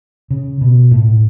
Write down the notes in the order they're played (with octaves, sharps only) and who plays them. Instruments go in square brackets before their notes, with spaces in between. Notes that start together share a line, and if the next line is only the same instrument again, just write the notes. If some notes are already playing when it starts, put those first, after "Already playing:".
[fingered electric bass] C#3
B2
A2